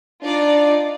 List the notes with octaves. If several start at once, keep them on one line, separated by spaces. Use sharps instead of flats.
D4 D#4 F4 D5